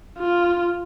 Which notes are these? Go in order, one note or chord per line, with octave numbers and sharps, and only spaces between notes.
F4